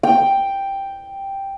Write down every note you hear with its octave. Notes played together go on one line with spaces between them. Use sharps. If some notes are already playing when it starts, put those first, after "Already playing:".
G5